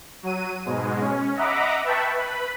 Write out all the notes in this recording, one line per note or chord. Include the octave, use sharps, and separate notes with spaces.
F#3 D#7
G#2 B2 G#3
C#4
D#5 E5 F#5 A#5 B5 D6
B4 E5 G5 A5 B5 C#6
B4 B5